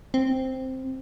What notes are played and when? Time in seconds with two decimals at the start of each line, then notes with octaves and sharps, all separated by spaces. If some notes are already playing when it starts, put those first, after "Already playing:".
0.14 C4